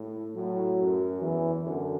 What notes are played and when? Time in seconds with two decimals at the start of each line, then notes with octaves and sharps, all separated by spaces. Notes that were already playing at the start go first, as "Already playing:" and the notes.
Already playing: A2
0.35 A2 F#3
0.79 F#2
1.22 E2 E3
1.64 F#2 D3